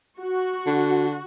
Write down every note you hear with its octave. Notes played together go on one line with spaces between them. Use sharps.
F#4
D3